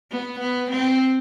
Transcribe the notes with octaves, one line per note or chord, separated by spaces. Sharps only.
B3
B3
C4